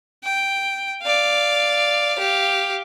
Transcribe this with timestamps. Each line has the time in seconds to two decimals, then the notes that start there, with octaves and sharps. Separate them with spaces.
0.23 G5
1.02 D5 F5
2.15 G4 F5